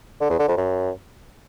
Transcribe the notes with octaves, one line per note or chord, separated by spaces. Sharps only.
D3
E2
D3
F2
F#2